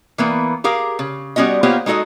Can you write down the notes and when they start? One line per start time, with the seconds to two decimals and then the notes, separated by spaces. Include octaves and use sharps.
0.18 E3 A#3 B3
0.64 G4 G#4 A#4 F5
0.99 C#3
1.36 G3 B3 C#4 F#4 D#5
1.63 A#3 B3 F4 G4 C5 C#5
1.86 G#3 D#4 F#4 A4 D#5